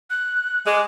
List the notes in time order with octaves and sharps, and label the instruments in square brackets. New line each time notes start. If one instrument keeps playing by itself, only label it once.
[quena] F#6
[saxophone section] G#3 [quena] D6